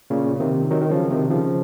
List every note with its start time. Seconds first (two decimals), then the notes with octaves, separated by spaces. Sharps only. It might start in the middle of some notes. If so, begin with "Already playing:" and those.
0.10 A#2 C#3
0.40 C3 D#3
0.71 D#3 F#3
0.81 D#3
0.91 C#3 F3
1.10 C3 D#3
1.30 C#3 F3